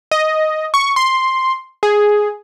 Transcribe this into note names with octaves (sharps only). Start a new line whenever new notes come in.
D#5
C#6
C6
G#4